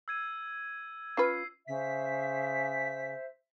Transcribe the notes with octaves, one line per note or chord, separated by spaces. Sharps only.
E6 G#6 D#7
C#4 F4 B4 C7
C#3 C5 E5 B6